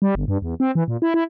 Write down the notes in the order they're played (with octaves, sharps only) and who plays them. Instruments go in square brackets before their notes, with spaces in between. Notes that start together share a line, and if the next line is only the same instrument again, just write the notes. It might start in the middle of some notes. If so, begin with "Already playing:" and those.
[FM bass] G3
G1
G2
E2
C4
E3
A#2
E4
E4